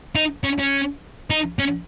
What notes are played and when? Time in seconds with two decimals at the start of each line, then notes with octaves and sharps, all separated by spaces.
0.16 D#4
0.44 C#4
0.59 C#4
1.30 D#4
1.59 C#4